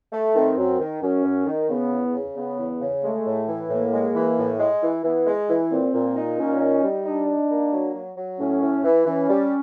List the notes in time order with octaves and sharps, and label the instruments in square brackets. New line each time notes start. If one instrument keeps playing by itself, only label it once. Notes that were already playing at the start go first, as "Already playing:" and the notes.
[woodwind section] A3
[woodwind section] D#3 [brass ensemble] C4
[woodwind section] F#2
D#3
[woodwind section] F#2 [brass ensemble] C#4
[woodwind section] F#2
D#3
[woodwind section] C#3 [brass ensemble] B3
[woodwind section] E2
C#3
[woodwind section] C#3 [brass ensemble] B3
[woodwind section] E2
C#3
[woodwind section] G#3 [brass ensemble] A3
[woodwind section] A2
E3
[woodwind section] A2 [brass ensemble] A#3
[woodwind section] G#3
E3
A2
G#3
E3
[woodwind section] E3 [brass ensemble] B3
[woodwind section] G#3
E3
[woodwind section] A#2 [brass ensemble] C4
[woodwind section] A#2
D#4
[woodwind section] A#2 [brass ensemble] C#4
[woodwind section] D#4
G3
[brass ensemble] D4 [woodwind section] D#4
[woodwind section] D#4
A#3
F#3
F#3
F#3
[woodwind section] A2 [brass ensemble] C#4
[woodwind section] A2
E3
[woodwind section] E3 [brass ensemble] C#4
[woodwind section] G3